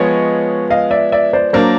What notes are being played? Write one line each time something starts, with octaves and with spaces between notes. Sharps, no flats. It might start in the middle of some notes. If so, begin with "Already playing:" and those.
Already playing: F3 G#3 B3 C#5 D#5
D#5 F5
D5 E5
D5 E5
C5 D5
F#3 A#3 D4 A#4 C5